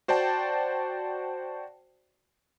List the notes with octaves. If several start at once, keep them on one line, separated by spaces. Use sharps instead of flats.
F#4 C5 D5 G5 A5